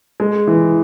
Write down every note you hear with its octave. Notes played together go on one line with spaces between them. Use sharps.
G#3
E3